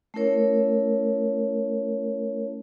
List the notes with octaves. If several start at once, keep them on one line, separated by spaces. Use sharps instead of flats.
A3 C#4 E4 A#4 C#5